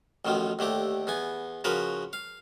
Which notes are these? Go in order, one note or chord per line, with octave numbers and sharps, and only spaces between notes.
A1 B2 D#3 F3
D#2 D3 A3 G4
E2 B3 G#5
C#3 F3 F#4 A#4 B4
F5